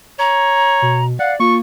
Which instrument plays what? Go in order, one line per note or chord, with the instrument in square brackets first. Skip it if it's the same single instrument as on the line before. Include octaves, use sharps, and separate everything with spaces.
[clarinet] C#5 [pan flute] A#5
[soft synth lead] B2
[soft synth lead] D5 [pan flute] F5 [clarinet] F#5
[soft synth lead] A#3 [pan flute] F4 [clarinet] C#6